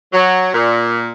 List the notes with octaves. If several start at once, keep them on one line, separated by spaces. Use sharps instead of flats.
F#3
A#2